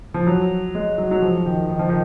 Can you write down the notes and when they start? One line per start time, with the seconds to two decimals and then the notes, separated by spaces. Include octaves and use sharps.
0.14 F3
0.27 F#3
0.75 G#3
0.98 F#3
1.11 F#3
1.22 F3
1.46 D#3
1.69 D#3
1.79 F3
1.89 D#3